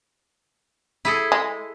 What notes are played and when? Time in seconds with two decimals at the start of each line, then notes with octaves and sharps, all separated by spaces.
1.05 E4 G#4 A4
1.32 G#3